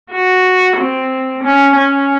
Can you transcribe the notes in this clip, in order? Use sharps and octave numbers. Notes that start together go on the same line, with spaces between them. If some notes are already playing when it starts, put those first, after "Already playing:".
F#4
C4
C#4
C#4